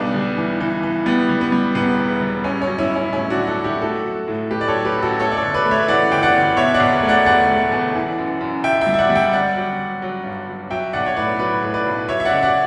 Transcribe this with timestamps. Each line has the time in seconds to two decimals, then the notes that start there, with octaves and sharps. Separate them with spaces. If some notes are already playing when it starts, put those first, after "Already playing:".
Already playing: B1 G3 B3 D4
0.14 G3
0.37 E3
0.60 E3
0.83 E3
1.06 G3 B3
1.29 G3
1.41 B3
1.52 G3
1.75 E1 B3
1.98 E2
2.21 G3
2.44 A1 C#4
2.62 C#4
2.67 F#3
2.78 C#4 E4
2.90 A1
2.95 C#4 E4
3.13 A2 C#4 E4
3.30 D4 F#4
3.36 F#3
3.47 F#4 A4
3.59 F#3
3.64 E4 G4
3.82 A3 F#4 A4
4.05 F#3
4.28 A2
4.51 A3 G4 B4
4.61 D5
4.68 A4 C#5
4.74 F#3
4.85 G4 B4
4.97 A1
5.02 F#4 A4
5.19 A3 A4 C#5
5.32 D5
5.37 A4 C#5
5.42 G1
5.54 B4 D5
5.65 A3
5.71 C#5 E5
5.88 E3 D5 F#5
6.11 G1 G5
6.23 D5 F#5
6.34 G1
6.57 B2 C#5 E5
6.74 D5 F#5
6.80 E1
7.03 A3
7.09 D5 F#5
7.26 E2 D5 F#5
7.49 A3
7.72 E2
7.95 E3
8.18 F#2
8.41 F#2
8.64 F#2 E5 G5
8.81 E5 G5
8.87 G3
8.94 E5
8.98 D5 F#5
9.10 G3
9.15 E5 G5
9.33 G1 D5 F#5
9.56 F#3
9.79 F#3
10.02 F#3
10.24 G2
10.48 F#3
10.70 F#3 E5 G5
10.93 B1 D5 F#5
11.06 C#5
11.17 A2 B4 D5
11.39 F#3 B4 D5
11.62 A2
11.74 B4 D5
11.86 B1
12.08 F#3 C#5 E5
12.20 E5
12.25 D5 F#5
12.31 C#2
12.43 D5 F#5